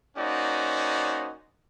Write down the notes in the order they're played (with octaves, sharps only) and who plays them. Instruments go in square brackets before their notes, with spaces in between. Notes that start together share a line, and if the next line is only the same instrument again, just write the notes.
[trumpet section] A#3 C#4 D#4 F#4 C5 D5